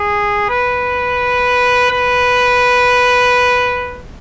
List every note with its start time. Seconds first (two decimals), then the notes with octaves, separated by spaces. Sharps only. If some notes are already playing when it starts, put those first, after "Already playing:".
Already playing: G#4
0.49 B4
1.90 B4